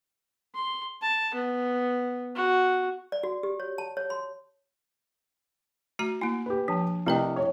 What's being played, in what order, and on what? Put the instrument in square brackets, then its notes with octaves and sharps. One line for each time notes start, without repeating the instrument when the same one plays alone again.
[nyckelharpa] C6
A5
B3
F#4
[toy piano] D5
F#4
G4
C#5
A5
C#5
C6
[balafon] A3 F#4 A#5
[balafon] A#3 E4 [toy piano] G#5
[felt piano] G4 B4
[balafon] F3 [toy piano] D4 A5
[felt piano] C2 [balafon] A3 B4 D#5 [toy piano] E4 E5 G5
[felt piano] C#5